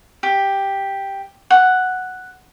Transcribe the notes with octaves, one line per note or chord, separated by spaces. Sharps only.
G4
F#5